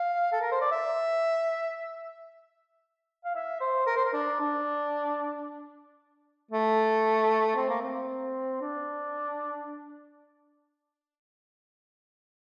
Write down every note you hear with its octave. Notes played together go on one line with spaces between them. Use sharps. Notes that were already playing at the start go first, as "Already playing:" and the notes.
Already playing: F5
A4
A#4
C5
D5
E5
F5
E5
C5
A#4
C5
A#4
D4
D4
A3
C4
A#3
C4
D4